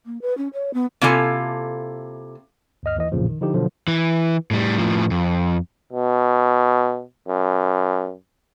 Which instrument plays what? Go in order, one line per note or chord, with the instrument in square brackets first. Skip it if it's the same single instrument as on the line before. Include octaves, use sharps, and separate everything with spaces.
[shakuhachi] A#3
B4
C#4
C#5
B3
[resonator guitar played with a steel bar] C3 A#3 E4 F4 A4 G#5
[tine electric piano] D2 G2 D#5 F6
D#2 E3 D#5
A1 F2 A#2 C#3 F3
D#3
D3 F3 D#4 E4 G4
B2 D3 F3 F#3
[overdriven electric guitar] E3
A2 G3
A2 F3
F2
[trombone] B2
F#2